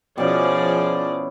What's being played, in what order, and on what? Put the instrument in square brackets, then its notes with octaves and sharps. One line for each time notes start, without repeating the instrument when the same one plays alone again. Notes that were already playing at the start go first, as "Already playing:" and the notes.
[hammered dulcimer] B2 C#4 E4 [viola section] F3 G#4 D5